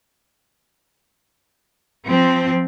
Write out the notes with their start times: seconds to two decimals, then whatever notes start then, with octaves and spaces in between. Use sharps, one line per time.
2.06 F3 C4